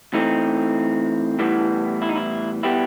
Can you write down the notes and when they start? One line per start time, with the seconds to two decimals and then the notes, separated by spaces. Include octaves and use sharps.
0.14 E3 A3 C4 D#4
1.39 A2 E3 G3 B3
2.02 E4
2.09 D#4
2.16 E4
2.63 B2 G3 B3 E4 G4